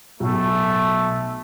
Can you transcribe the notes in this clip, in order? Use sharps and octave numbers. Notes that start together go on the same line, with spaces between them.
B1 A3